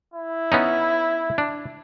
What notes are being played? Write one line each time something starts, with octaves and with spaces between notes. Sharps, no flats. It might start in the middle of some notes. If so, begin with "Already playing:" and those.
E4
B3 C#4 D#4
D4